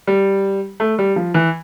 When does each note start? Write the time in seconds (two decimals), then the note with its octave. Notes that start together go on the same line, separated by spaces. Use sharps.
0.07 G3
0.80 A3
0.99 G3
1.16 F3
1.34 E3